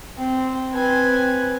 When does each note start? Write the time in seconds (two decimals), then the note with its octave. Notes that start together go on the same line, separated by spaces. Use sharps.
0.17 C4
0.73 C4 B4 G#5